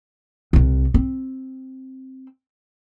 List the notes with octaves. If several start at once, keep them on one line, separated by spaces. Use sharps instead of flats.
C2 C3
C4